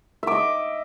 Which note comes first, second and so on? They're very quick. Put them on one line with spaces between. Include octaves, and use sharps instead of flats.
E5 D6 D#5